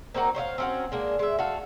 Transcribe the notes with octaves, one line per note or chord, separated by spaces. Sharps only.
A#3 C4 D#4 F#4
C5 C#5 D#5 F5
C4 C#4 F#4
G#3 A#3 D4
G#3 E5
F#4 A4 F5